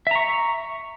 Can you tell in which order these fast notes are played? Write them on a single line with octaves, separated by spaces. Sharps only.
E5 A#5 C#6